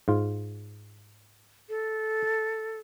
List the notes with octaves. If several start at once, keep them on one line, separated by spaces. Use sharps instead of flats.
G#2 F4
A4